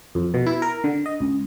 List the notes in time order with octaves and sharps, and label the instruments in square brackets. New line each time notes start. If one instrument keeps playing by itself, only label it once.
[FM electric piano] F2
B2
E4
A#4
D3
D#5
C#2